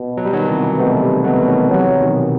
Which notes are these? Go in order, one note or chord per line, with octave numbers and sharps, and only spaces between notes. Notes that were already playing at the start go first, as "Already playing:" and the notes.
Already playing: B2
F#3
G3
D#3 F#3
C3 E3
B2 A3 C4
G3 B3
B2 F#3 A3
D#3 F#3
C3 E3 F#3
B2 D#3